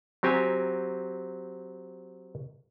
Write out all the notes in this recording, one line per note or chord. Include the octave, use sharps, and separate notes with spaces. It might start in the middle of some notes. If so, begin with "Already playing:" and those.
F#3 C4 G4 G#5 A#5